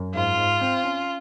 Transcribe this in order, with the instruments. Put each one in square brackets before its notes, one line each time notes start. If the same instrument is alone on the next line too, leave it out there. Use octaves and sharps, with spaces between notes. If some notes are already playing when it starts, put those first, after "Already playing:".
Already playing: [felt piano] F#2
[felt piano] G#2 [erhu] F4
[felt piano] G#2
C4
C#4